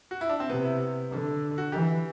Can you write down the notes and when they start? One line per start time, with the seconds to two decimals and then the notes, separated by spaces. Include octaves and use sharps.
0.11 F#4
0.21 E4
0.29 D4
0.40 C4
0.49 C3 B3
0.64 E4
1.11 D3
1.58 F#4
1.72 E3 G4